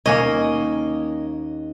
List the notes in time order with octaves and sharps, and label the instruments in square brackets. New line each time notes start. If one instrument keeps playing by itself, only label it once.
[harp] D#2 [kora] A#3 C#4 C#5 [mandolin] D#5